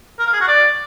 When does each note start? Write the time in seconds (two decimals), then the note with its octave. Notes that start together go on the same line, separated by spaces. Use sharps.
0.19 A#4
0.26 F5
0.34 G#4
0.41 F#4
0.48 D5